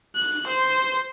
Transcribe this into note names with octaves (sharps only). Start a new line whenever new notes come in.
F#6
C5